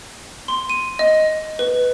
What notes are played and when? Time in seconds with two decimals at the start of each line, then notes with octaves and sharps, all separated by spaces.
0.48 C6
0.70 D#7
0.99 D#5
1.59 B4